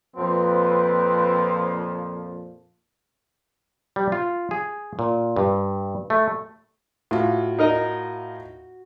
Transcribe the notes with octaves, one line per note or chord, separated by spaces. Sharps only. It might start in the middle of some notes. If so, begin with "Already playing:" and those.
F2 A#2 F3 C4 B4
G3
F4
G#4
A#2
G2
A3
A2 F4 F#4
D#4 A#4 D#5